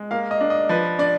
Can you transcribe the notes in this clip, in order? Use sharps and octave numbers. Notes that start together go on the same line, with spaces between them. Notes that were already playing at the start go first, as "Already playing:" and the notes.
Already playing: G#3
A#3 F5
D#5
D4
D#5
F3 B4
D4 D5